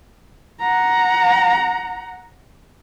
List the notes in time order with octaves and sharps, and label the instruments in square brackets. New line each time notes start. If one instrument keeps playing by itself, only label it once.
[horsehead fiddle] F#5 A#5